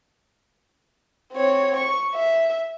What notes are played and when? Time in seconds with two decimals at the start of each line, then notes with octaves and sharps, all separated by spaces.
1.33 C4 C#5
1.77 C#6
2.15 E5